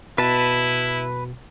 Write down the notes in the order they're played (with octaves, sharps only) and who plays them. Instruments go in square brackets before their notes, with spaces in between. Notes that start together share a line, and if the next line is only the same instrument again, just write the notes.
[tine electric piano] B2 [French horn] E4 [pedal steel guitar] B4 A5